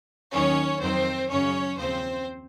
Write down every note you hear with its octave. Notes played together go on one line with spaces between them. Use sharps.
D#2 D#3 F#3 C#4 C#5
F2 D#3 F#3 C4 C5
F#2 C#3 F#3 C#4 C#5
D#2 C#3 F3 C4 C5